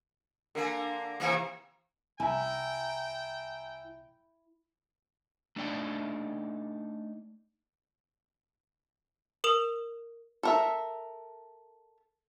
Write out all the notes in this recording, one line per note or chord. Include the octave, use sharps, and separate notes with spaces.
D3 A#3 A#4 G#5
C3 E3 A#3
C2 E4 E5 G5 G#5 A#5
A3 D4 D#4 D5 G5
A#4 D#6 E7 F7
A4 A#4 E5